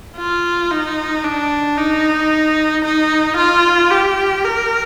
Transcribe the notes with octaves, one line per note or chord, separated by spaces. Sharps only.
F4
D#4
D4
D#4
D#4
F4
G4
A#4